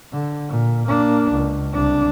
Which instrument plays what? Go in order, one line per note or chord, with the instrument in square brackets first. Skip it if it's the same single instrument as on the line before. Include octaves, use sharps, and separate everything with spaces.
[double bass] D3
A#2
A#3 D4
C#2
C2 D4